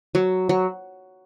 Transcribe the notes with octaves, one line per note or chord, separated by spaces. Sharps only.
F#3
F#3